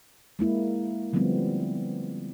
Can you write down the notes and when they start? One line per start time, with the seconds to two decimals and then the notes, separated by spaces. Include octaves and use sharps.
0.39 G#3 A#3 E4
1.13 D3 F3 G3 A3 B3 C4